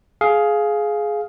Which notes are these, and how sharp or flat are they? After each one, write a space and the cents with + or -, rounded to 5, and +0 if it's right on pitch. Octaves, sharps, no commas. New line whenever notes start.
G#4 +15 F5 +0